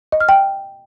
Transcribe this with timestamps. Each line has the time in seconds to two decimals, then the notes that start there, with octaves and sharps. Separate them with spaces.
0.12 D#5
0.21 F6
0.29 G5